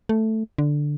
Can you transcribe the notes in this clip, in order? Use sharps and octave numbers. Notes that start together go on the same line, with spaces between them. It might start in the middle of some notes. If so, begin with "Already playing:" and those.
A3
D3